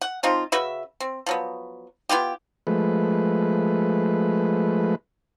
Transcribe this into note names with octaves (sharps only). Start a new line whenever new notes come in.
F#5
F3 C4 D#4 F4
C#3 F#4 B4 E5
C4
F3 F#3 B3
B3 E4 F4 G4
F3 G#3 A3 B4